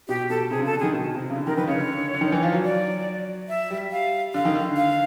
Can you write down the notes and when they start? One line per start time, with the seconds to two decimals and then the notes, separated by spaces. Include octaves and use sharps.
0.08 B2 G4
0.30 B2 A4
0.50 C3 G#4
0.58 D3
0.61 C#3 A4
0.72 D3
0.79 D#3 G#4
0.93 B2
1.15 C3
1.30 C#3
1.36 D3
1.47 D#3 A#4
1.57 D#3 B4
1.67 C#3 C#5
1.79 D3
2.14 D3
2.21 D#3
2.32 E3
2.43 F3
2.53 F#3
2.64 D5
3.49 E5
3.71 G3
3.91 F5
4.34 D3 F5
4.45 D#3
4.55 D3
4.76 F5